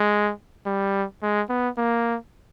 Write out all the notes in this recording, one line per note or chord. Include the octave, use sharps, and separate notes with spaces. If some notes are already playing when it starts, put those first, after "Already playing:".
Already playing: G#3
G3
G#3
B3
A#3